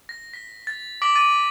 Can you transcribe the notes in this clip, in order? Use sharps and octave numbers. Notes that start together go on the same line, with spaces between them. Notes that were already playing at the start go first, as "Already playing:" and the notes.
A#6
B6
A6
D6 B6 D7 F#7
D6 A6 D#7